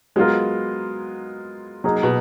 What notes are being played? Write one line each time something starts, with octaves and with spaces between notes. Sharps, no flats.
F#3 G#3 B3 F4 A#4
F#3 A#3 D#4 G#4
B2